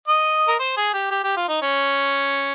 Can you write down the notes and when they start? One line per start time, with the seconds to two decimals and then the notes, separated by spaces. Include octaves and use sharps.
0.08 D#5
0.48 A#4
0.59 C5
0.77 G#4
0.93 G4
1.11 G4
1.24 G4
1.37 F4
1.48 D#4
1.62 C#4